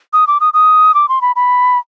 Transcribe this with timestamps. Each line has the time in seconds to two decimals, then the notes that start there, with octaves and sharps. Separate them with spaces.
0.13 D#6
0.27 D6
0.40 D#6
0.54 D#6
0.94 D6
1.09 C6
1.22 B5
1.36 B5